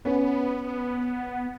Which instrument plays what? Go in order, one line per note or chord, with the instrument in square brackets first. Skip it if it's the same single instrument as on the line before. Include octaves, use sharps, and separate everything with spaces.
[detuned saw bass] B3 [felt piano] C#4 B4